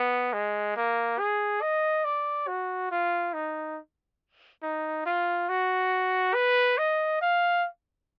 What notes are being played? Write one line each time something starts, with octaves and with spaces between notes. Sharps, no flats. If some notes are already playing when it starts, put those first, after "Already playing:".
Already playing: B3
G#3
A#3
G#4
D#5
D5
F#4
F4
D#4
D#4
F4
F#4
B4
D#5
F5